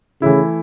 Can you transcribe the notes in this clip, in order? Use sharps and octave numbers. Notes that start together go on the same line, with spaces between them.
C#3 E3 A3 E4